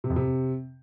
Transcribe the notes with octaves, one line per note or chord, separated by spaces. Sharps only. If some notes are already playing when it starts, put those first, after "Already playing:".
C3
F2
C3